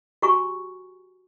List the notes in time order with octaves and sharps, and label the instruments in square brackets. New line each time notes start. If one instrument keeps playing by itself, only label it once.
[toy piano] F#4 G4 G#5 A#5 C#6